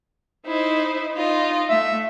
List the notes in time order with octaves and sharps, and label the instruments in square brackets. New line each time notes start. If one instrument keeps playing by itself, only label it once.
[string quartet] D#4 E4 C5
D#4 F4 D#5
[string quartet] A3 [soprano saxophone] E5